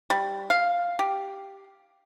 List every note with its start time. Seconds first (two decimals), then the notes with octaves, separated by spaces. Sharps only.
0.10 G3
0.50 F5
0.99 G4